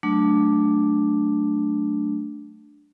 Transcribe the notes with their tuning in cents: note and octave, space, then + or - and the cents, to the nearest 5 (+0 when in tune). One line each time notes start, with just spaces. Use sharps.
F#3 +25 A3 +0 D4 +0